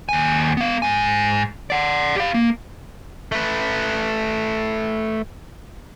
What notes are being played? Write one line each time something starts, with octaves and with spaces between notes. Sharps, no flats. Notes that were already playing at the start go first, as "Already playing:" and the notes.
D#2 G#5
B3 F5
G#2 G#5
D5 F#5
G4 F5
A#3
A3 B4